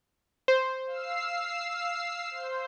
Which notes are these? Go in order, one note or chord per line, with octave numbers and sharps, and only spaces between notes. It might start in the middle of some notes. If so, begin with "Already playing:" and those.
C5
F5 E6 C7
C5